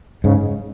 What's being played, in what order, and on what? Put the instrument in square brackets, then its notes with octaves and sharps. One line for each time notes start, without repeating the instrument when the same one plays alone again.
[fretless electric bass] G#2 [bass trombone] C#3